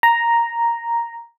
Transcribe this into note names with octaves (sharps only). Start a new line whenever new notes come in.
A#5